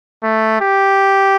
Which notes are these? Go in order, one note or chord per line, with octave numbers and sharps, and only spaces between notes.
A3
G4